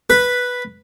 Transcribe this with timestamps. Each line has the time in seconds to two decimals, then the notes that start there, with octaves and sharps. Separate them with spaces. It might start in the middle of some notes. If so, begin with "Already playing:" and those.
0.10 B4